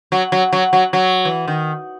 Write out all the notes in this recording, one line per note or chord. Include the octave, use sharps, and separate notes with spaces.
F#3
F#3
F#3
F#3
F#3
E3
D#3